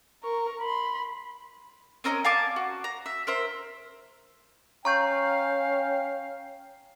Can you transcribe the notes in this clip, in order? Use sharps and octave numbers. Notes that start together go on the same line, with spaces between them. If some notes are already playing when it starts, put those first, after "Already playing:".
A#4 C#6
B5 C6
C4 C#4 A#4 D#5
F5 G#5 A5 D6
F#4
A#5
E5
A#4 C5 E5
C#4 F5 G5 A#5 C#6 G6